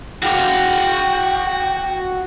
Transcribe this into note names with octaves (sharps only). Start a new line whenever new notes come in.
F#4 F5 G5